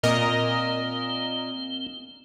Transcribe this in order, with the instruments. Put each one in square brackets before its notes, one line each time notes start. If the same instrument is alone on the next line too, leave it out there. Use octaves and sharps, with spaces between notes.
[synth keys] A#2 A#4 D#5 [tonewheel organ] C4